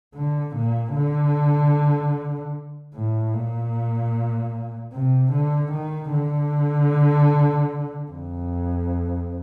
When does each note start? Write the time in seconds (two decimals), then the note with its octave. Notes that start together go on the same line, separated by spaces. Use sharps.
0.15 D3
0.56 A#2
0.96 D3
2.95 A2
3.34 A#2
4.93 C3
5.33 D3
5.73 D#3
6.13 D3
8.11 F2